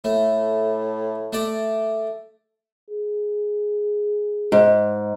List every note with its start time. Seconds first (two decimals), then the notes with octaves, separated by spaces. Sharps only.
0.04 A2 A3
1.33 A3 A4 D5
2.91 G#4
4.52 G#2